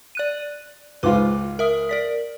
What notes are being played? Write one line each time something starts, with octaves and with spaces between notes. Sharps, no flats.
D5 F#6 D#7
C#2 G#2 F4 B4 D6
A#4 E5 D#6
A#4 D5 B6